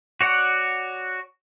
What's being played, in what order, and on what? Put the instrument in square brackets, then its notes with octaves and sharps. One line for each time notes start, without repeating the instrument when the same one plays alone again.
[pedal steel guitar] F#4 C#5 D5 F#5